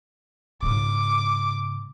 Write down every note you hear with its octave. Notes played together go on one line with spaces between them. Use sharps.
G#2 C#3 D6